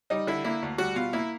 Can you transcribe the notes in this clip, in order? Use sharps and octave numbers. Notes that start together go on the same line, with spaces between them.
G3 D#4
D3 E4
A#3 E4
D2
G3 F#4
B2 F4
A#3 E4